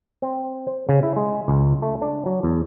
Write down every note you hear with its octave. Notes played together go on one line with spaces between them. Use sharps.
C4
C5
C#3
E4
G#3
C#2
A3
D4
F#3
E2